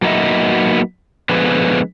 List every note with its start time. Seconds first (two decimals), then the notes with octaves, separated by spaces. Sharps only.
0.02 F#3 A#3 B3 D#4 D#5 E5
1.29 D3 F3 G#3 B3 B4